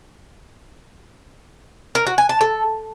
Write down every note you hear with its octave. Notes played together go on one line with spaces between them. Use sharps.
A#4
F#4
G#5
A5
A4